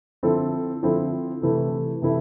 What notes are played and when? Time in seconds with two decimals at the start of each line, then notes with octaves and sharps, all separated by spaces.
0.23 D3 F3 C4 E4 A4
0.83 D3 F3 C4 E4 A4
1.42 C3 E3 A3 E4
2.02 C3 E3 A3 E4